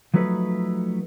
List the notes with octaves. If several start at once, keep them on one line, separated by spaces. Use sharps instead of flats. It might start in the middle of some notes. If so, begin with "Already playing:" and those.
F3 F#3 A3 D#4 B4